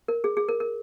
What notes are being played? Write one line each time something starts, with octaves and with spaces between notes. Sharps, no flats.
A#4
G#4
G#4
A#4
A#4